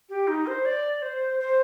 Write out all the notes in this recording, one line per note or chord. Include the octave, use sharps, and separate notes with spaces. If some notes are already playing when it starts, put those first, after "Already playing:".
G4
D#4
C5
D5
C5
C5